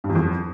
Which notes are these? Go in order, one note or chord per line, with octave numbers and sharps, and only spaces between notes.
G2
E2
F2